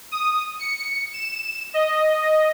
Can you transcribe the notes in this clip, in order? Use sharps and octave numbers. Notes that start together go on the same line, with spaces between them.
D#6
C#7
E7
D#5